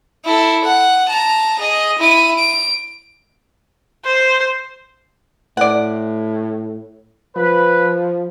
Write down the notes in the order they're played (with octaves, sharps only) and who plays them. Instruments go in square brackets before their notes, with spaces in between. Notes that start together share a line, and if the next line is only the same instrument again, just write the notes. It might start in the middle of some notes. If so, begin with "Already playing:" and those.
[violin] E4 A4
F#5
A5 A#5
G#4 D#5
E4 D#7
D7
[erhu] C5
[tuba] A2 [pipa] D5 F#5
[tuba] F3 [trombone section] B4